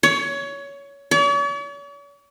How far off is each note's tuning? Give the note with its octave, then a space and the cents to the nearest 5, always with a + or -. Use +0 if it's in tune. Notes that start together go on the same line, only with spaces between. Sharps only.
C#5 +20
C#5 +45